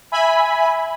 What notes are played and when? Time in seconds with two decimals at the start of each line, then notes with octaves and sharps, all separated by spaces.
0.12 E5 G#5 B5